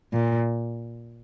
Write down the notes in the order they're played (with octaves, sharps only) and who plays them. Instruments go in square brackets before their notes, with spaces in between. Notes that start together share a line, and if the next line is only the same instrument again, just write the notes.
[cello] A#2